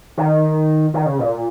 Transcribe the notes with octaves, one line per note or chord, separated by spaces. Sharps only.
D#3
D#3
C#3
A#2